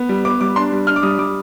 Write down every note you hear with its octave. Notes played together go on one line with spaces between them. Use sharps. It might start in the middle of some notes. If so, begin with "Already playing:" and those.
Already playing: B3
G3
B3 D6
G3 D6
D4 C6
G3
D4 F6
D6
G3 D#6
G3 D6